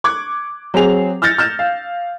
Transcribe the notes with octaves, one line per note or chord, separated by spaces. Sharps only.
C#6 D6 F#6 G#6
F#3 C4 G#4 F7
E6 F6 G6 A6 A#6 C#7
F6 G6 E7
F5